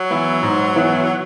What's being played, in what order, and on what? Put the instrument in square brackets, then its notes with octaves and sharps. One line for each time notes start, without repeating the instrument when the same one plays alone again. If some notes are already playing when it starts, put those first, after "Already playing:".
Already playing: [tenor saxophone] F#3
[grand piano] E3 B3 E4
G#2
E3 B3 E4